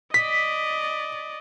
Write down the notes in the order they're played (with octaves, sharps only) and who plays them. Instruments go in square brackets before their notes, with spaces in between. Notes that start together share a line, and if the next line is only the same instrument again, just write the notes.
[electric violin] D5 D#5 [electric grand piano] B6